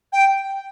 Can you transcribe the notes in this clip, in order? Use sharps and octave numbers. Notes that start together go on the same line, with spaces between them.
G5